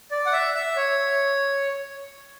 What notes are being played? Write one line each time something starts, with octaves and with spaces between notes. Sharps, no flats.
D5
F#5
E5
E5
C#5